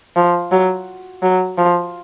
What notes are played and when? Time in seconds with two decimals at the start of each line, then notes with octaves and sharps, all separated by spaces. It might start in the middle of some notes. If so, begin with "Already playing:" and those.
0.16 F3
0.52 F#3
1.23 F#3
1.58 F3